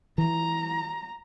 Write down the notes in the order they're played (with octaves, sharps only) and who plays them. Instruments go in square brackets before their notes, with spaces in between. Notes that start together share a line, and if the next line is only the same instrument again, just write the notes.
[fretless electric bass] E3 [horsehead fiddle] A#5